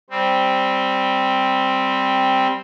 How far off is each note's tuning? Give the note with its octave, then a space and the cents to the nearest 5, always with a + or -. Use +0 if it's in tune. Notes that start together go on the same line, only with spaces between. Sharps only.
G3 +0 C4 +0